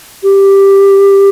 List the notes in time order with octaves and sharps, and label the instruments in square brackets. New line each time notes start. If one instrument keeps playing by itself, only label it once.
[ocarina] G4